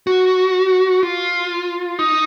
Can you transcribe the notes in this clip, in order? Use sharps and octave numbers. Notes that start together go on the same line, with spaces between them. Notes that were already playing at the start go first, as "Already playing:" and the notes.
F#4
F4
D#4